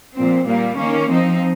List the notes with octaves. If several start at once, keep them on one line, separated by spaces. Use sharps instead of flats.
A#2 F3 C4
A#2 G3 A#3
D#3 A#3 C#4
F3 C4 D#4